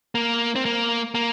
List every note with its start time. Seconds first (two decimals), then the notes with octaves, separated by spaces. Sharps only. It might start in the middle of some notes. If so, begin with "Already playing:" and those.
0.15 A#3
0.56 C4
0.65 A#3
1.15 A#3